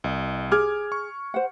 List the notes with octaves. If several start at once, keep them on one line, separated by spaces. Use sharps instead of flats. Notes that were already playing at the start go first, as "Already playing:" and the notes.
C2 D#5
G#4 D6 F6 G#6
C#6
C5 F#5